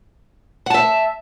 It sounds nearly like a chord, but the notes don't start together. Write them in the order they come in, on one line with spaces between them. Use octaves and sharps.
F#5 A5 E5